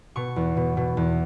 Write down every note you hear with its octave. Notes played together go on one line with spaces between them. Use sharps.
B2 C#6
E2
B2
B2
E2